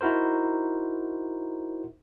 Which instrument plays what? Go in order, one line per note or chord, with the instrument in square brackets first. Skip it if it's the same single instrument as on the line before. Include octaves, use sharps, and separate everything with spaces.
[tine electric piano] D#4 E4 F#4 A#4 C5